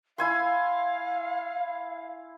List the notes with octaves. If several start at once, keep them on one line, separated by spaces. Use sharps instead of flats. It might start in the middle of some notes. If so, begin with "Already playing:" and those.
E4 F5 G#5 C6